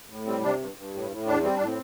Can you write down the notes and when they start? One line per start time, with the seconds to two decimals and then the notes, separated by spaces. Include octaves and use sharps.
0.10 A2
0.26 G3 C4
0.43 C3 D4
0.60 G2
0.77 G2
0.94 A2
1.11 A2
1.27 E2 D4
1.44 G3 C4
1.56 A2 D4
1.66 C4